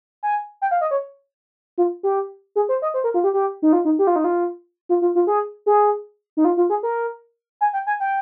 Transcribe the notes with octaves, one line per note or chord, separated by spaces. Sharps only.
G#5
G5
F5
D#5
C#5
F4
G4
G#4
C5
D#5
C5
A#4
F4
G4
G4
D#4
F4
D#4
G4
F4
D#4
F4
F4
F4
F4
G#4
G#4
D#4
F4
F4
G#4
A#4
G#5
G5
G#5
G5